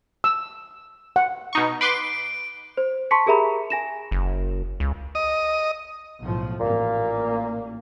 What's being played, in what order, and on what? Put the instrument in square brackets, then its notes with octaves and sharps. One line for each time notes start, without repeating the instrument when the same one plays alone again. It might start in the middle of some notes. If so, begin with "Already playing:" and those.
[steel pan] E6
F#5
[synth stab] B2 D#4 C#6
[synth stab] B4 C6 D6 [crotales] D7
[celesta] C5
A5 C6 C#6 B6 C#7
G4 G#4 A#4 E5 A#5 B5
G#5 A#6 E7
[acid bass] F#1
C#2
[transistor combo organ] D#5
[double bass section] B1 A2 F3
[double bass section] A1 A#3 [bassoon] A#2